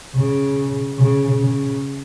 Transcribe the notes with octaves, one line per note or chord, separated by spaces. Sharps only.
C#3
C#3
C#3